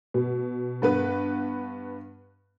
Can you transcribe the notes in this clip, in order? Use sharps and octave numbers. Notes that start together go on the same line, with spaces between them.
B2
G2 B3 B4